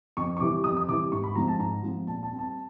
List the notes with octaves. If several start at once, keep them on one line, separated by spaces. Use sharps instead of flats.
F2 C#6
C#6
C3 E3 G3 D6
F2 D#6
D#6
C3 E3 G3 D6
G#2 C#6
B5
F3 G#3 C4 A#5
A5
G#2 A#5
F3 G#3 C4
A#2 A5
A5
G3 C4
A5